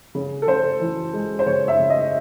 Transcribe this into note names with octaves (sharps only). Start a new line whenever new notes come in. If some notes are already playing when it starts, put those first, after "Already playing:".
C#3
A4
C#3 C5
E3
G#3
C5
C#3 C#5
E5
C#3
D#5